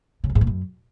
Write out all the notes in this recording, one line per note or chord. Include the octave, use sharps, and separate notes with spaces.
C#3
F#2
G#2
A#2
F#2